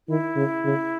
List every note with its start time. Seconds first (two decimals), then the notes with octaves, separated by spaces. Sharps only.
0.08 D#3 E4
0.36 C#3
0.65 C#3